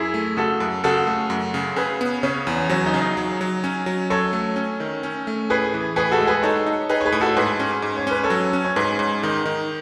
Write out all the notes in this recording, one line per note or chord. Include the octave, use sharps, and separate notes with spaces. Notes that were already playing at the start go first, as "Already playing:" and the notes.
Already playing: F#2 E4 G#4
A3
C#3 F#4 A4
F#2
C#3 F#4 A4
A3
F#2
C#3
C#3 G#4 B4
B3
C#3 C#4
E2
F#3 C#4
D#4
C#3
D#4
F#3
F#3
C#4
F#3
F#3 A4 C#5
A3
C#4
D#3
C#4
A3
A2 G#4 B4
E3
A2 G#4 B4
F#4 A4
G#3
G#4 B4
D#4 A4 C#5
D#4
D#4 G#4 B4
C#5
G#4 B4
A2
F#4 A4
G#2 G#4 B4
C#4
G#2
C#5
C#4 B4
A4 C#5
F#3
C#4
C#5
G#2 G#4 B4
G#2
D#3 D#4
D#3